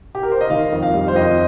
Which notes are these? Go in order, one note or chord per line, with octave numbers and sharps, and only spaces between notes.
G4
A#4
C5
D#5
D#3 F5
F2
F5
G3
C5
F2 D#5